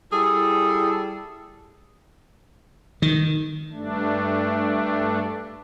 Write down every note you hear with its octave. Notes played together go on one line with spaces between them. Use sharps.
G3 E4 G#4 A4
D#3
G2 A3 D4